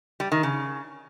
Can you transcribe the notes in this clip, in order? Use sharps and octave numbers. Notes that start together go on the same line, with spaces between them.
G3
D#3
C#3